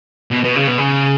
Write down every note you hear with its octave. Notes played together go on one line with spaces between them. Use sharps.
B2
B2
C#3
B2
C#3